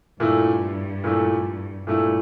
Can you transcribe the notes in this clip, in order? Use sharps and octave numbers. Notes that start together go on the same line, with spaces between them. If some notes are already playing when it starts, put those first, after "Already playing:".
G2 A#2 A3 E4
A#2 A3 E4
G2 A#2 A3 E4